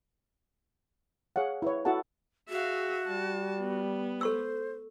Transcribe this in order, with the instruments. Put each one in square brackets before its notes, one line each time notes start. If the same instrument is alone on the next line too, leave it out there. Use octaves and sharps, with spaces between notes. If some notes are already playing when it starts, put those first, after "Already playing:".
[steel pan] G#4 C#5 F5 F#5
E4 B4 C#5
E4 F#4 A4 F#5 A5
[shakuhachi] F#4 [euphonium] G#4 [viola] E5 F5
[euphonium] G3 [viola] A5
[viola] B3
[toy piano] A4 C#6 E6 [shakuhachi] C5